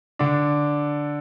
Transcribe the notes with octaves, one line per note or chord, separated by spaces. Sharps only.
D3 D4